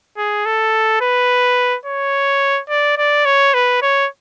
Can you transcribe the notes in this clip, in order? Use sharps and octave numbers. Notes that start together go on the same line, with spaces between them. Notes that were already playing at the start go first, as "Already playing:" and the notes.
G#4
A4
B4
C#5
D5
D5
C#5
B4
C#5